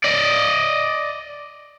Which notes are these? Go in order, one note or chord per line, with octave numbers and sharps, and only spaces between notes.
D5 D#5